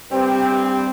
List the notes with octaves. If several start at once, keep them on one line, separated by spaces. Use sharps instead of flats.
G2 C4 G4